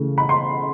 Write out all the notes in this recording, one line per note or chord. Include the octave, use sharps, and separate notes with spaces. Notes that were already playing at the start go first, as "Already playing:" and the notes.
Already playing: C#3 E3 A3
B5
C6